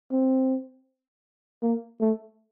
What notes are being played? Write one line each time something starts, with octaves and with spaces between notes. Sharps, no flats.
C4
A#3
A3